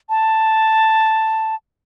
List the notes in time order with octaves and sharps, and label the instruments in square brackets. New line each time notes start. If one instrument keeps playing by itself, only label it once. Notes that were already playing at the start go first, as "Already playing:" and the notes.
[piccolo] A5